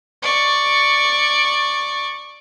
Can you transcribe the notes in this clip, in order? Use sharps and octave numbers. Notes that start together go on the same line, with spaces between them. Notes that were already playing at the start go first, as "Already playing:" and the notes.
D5 C#6